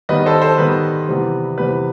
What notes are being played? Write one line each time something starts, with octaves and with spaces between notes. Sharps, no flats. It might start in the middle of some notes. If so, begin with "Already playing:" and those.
D#3 G3 B3 B4 D#5
A4 C5
A4 C5
D#3 G3 B3 B4
C3 E3 G3 B3
C3 E3 G3 B3 B4